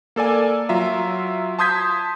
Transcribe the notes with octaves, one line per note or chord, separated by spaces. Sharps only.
A#3 A4 D5 G#5
F#3 F4 E5 A#5
A5 C6 D#6 G6 G#6 B6